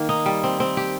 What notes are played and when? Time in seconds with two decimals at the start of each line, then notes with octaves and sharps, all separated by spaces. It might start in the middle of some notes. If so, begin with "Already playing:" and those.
Already playing: D#3 A#3
0.09 D#4
0.26 G3
0.44 C4
0.60 C4
0.77 G4